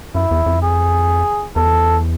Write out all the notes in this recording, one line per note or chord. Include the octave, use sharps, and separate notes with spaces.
F#2 E4
E2
F2
G#4
E2 A4